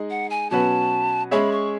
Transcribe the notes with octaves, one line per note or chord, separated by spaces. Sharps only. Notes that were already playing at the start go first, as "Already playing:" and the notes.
Already playing: G#3 D#4 G#4 D#5
F#5
G#5
B2 F#3 C#4 F#4 B4 A5
G#3 C#4 G#4 C#5 E5 B5
C#6